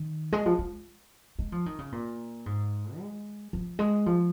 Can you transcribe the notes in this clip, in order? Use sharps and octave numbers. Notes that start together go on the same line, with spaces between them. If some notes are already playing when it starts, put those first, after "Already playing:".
Already playing: D#3
G#3
F3
G#3
G#3
F3
D#3
C#3
A#2
G#2
G#3
F3
G#3
F3